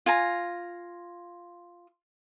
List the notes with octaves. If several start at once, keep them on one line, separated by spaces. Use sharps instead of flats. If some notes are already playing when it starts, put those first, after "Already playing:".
F4 G#5 A#5